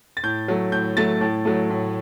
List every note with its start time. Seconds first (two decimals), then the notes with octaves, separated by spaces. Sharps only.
0.17 A6
0.23 A2 G6
0.48 F#3 A3
0.72 A2 G6
0.97 F#3 A3 A6
1.21 A2
1.45 F#3 A3
1.70 A2